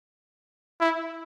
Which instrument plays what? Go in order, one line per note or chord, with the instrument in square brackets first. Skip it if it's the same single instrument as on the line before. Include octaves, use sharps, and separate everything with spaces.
[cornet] E4